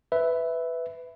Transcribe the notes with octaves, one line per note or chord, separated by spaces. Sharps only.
B4 E5